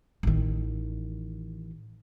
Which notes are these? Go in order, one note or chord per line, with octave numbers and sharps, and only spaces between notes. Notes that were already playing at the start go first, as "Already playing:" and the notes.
A1 D#3